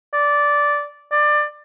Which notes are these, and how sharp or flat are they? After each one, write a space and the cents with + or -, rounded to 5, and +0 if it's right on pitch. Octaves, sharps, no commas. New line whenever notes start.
D5 -10
D5 +20